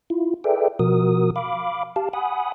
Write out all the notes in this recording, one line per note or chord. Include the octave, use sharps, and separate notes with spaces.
E4 F4
G#4 A4 B4 D5 E5 G5
B2 F3 F#4 A#4 D#6
F5 B5 D6
G4 F5 A5
F#5 G#5 B5 D#6